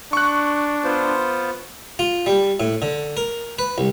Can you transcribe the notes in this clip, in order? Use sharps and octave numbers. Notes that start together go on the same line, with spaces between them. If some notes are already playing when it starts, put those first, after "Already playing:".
D4 C#6 F#6
B3 F4 C5
F4
G3
A2
D3
A#4
B4
C2